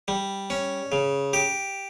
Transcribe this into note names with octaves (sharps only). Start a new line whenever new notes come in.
G3
C#4
C#3
G4